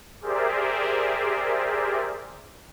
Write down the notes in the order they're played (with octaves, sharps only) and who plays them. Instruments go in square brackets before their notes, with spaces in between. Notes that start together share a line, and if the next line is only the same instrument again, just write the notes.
[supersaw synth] G4 G#4 A#4 C5 D5 E5